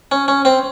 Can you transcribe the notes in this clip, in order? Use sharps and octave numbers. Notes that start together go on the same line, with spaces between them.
C#4
C#4
C4